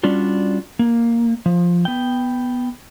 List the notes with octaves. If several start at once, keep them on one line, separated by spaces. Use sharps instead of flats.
G3 C#4 D4 F4 F#4
A#3
F3
B3 G5